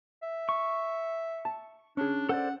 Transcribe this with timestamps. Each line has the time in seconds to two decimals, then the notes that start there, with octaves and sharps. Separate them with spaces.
0.22 E5
0.49 C#6
1.45 A5
1.97 C#4 D4 G#4
2.29 A4 C5 D5 F#5